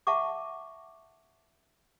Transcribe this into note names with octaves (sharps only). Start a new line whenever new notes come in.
E5 F#5 A5 A#5 C#6 D6